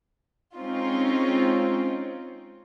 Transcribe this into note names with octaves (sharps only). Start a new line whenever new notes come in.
G#3 C4 C#4 D#4 F4